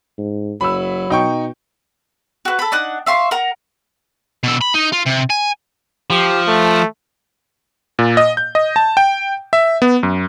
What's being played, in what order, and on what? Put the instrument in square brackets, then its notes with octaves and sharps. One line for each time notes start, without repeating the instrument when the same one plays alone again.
[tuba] G#2
[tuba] F#1 [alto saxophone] F#3 [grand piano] B5 E6
[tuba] B2 [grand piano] D#4 G5 C#6
[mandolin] F#4 B4
A4 B5
D4 D#4 F#5
E5 F5 C6 C#6
A#4 F#5 A#5
[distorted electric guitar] B2 E5
B5
D#4
F4
C3
G#5
[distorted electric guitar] F3 [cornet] G4
[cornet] A3
[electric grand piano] A#2
D#5
G6
D#5
A5
G5
E5
B3
F#2